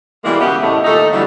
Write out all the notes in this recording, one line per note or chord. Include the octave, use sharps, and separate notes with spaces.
B2 E3 G3 G#3 A#3
C#3 B3 C#4 G4 E5 F#5
E2 A2 C3 A3 C#4 D#5
D#2 A#2 A3 D#4 A4
D3 E3 F#3 G3